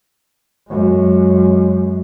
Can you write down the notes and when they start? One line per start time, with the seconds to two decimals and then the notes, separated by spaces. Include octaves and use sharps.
0.69 F#2 G#3